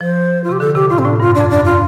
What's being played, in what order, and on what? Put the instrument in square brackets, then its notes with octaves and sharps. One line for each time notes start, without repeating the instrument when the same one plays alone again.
[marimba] F3 [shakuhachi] C5
[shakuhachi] F4
[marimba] C3 [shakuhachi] G4
[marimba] D3 [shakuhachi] A4
[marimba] C3 [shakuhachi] G4
[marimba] A2 [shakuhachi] F4
[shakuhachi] C4
[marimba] A2 [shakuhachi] D4
[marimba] G2 [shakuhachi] F4
[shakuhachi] D4
[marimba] F2
[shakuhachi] D4
[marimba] G2
[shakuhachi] F4